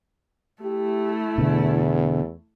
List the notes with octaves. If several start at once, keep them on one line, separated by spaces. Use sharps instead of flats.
A3 E4 G4
E2 B2 D3